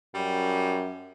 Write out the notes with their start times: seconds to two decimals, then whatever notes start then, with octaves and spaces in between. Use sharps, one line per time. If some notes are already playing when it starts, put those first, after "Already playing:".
0.15 F#2 G3